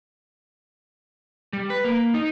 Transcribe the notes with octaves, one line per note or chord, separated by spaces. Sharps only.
G3
B4
A#3
D#4